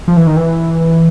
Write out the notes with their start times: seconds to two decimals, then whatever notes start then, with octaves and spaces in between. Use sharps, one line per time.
0.08 F3
0.17 E3
0.27 D#3
0.37 E3